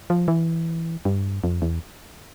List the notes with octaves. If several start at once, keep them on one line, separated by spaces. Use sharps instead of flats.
F3
E3
G2
F2
E2